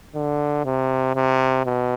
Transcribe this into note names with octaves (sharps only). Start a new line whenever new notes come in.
D3
C3
C3
B2